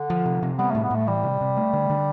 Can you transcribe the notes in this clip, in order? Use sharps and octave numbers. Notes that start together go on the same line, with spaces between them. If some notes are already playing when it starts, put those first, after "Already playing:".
Already playing: D3
F3
C3
C3
G3 B3
A2 A3
B3
A2 A3
E3 G3
C3
C3
A3
D3
D3